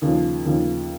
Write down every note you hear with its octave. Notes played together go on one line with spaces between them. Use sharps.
D#2 C#3 F3
D#2 C#3 F3